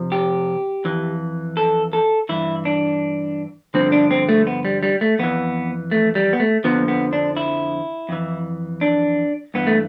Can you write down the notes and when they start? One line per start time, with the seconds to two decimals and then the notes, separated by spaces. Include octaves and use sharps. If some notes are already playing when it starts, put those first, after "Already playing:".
Already playing: F2 C3 F3
0.12 G4
0.85 F2 E3
1.57 A4
1.93 A4
2.29 G2 E3 E4
2.65 D4
3.74 G2 D3 F3 C4
3.92 D4
4.11 C4
4.29 A3
4.47 B3
4.65 G3
4.83 G3
5.01 A3
5.19 F2 E3 B3
5.91 A3
6.15 G3
6.33 B3
6.40 A3
6.64 F2 D3 F3 B3
6.88 B3
7.13 D4
7.37 E4
8.09 F2 E3
8.81 D4
9.54 G2 E3 B3
9.67 A3